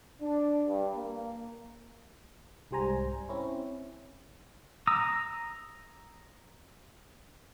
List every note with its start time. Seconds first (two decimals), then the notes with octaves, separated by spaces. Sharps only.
0.21 D4
0.67 G2
0.95 A#3
2.71 C2 G#2 G3 C5 G#5 A#5
3.29 C4 C#4 E4
4.87 A#5 D#6 E6